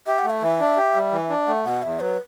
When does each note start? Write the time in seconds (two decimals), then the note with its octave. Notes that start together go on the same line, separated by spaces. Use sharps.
0.07 G4 E5
0.19 F#5
0.24 A3
0.30 E5
0.42 E3
0.60 D4
0.77 G4
0.95 G3
1.12 E3
1.30 D4
1.47 A3 F#5
1.65 B2 F#5
1.82 E2 E5
2.00 F#3 B4